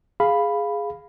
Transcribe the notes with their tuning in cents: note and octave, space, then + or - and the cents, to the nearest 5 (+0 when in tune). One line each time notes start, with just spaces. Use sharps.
G#4 +0 F5 +0 B5 +0